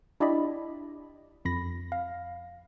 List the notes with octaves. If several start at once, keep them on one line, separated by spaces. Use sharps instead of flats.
D4 E4 G4 D5 D#5 B5
F2 B5 A#6
F5